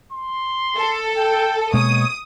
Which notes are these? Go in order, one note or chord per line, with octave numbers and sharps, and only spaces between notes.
C6
A4
G5
B2 G#3 A#3 C#5 D#6